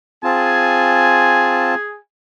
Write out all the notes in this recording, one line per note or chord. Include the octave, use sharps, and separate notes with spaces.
C4 F4 G#4 G#5 A5